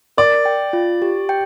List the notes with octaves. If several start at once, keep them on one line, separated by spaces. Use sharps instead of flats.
A#4 D5
G5
F4
G4
G5